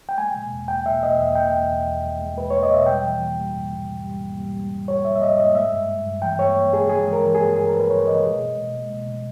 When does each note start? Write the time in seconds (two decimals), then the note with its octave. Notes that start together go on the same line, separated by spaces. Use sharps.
0.09 G5
0.18 G#3 G#5
0.36 B2
0.52 E2
0.68 E2 G5
0.85 B2 E5
1.03 B2 D#5
1.19 E2 E5
1.35 E2 G5
1.53 E2
1.70 E2
1.87 E2
2.03 E2
2.19 G#3
2.37 E2 B4
2.50 E2 C#5
2.63 D#5
2.70 B2 E5
2.86 G3 G5
3.04 E3
3.20 E3
3.37 G3
3.54 G#2
3.71 G#2
3.87 G#2
4.05 G3
4.21 G#2
4.38 G3
4.54 G3
4.71 G#2
4.88 G3 C#5
5.05 G#2 E5
5.16 E5
5.21 G#2 D#5
5.38 G#2 D#5
5.55 G#3 E5
5.71 G2
5.89 G2
6.06 G2
6.22 E3 G5
6.39 G2 C#5
6.56 G#3
6.73 G2 G#4
6.89 G#3 G#4
7.06 E3
7.12 A#4
7.23 E3
7.35 G#4
7.40 G2
7.56 G2 G#4
7.66 A#4
7.74 G2 B4
7.90 G2 C#5
8.06 E3 D#5
8.24 B2
8.40 G#3
8.58 B2
8.73 G#3
8.91 B2
9.08 B2